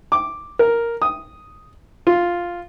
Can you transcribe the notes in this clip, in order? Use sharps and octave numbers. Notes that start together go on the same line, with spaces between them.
D6
A#4
D#6
F4